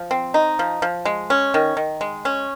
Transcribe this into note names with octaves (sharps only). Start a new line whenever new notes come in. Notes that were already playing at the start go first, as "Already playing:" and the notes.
Already playing: F3
C4
D#4
F3
F3
G#3
C#4
D#3
D#3
G#3
C#4